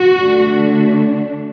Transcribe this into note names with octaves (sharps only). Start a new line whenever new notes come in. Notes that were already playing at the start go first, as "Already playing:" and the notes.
Already playing: F#4
D3 A3 D4